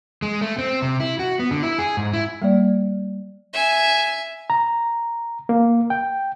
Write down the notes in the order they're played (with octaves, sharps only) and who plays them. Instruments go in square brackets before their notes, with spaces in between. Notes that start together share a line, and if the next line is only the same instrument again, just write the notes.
[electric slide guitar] G#3
A3
C4
C3
E4
F#4
B3
D3
E4
G#4
G#2
E4
[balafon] G3 A#3 D5
[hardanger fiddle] E5 G#5
[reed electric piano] A#5
A#3
G5